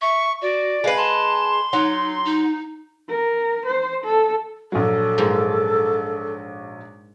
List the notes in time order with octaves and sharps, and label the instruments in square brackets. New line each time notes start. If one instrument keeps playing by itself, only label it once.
[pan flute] E5 [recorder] C#6
[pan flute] F#4 [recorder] D5
[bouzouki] G#3 B4 [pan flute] F5
[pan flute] A5 [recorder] C6
[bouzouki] F#3 [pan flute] D#4
[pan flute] D#4
[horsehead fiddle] A#4
C5
A4
[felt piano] A#1 F#3 [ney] A4
[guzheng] G#2 F3 A#3